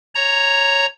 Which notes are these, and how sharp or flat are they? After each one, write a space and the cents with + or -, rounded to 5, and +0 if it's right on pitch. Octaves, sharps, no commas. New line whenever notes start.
C#5 -5 A#5 +0